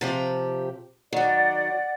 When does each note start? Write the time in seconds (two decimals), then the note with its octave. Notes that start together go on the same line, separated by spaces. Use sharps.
0.01 C3 F3 G4
1.13 D#3 F#3 D5 F#5